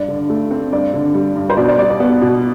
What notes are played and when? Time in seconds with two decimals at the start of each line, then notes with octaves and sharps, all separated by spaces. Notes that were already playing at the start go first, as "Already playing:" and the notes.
Already playing: G2 D5
0.08 D3
0.30 A3
0.51 C4
0.72 G2 D5
0.94 D3
1.14 G3
1.36 G2
1.50 C5
1.57 B2 D5
1.68 D5
1.78 G3 D5
1.90 D5
2.00 B3
2.22 B2